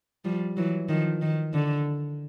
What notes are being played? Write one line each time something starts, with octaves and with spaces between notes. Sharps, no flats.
F3 G3
E3 F#3
D#3 F3
D#3
D3